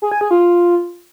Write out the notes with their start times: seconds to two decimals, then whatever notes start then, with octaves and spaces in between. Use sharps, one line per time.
0.02 G#4
0.12 G#5
0.21 G#4
0.31 F4